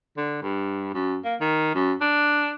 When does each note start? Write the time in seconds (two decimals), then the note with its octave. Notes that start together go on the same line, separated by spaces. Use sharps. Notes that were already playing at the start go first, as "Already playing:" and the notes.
0.17 D3
0.42 G2
0.94 F#2
1.24 A#3
1.41 D#3
1.75 F#2
2.01 D4